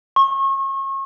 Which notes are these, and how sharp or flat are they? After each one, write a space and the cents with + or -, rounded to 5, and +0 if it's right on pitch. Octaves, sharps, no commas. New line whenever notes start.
C#6 -35